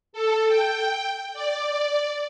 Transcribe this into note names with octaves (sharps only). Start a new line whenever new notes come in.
A4
G5
D5